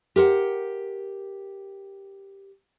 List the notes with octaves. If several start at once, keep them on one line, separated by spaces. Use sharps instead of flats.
G4 A#4 C5 F#5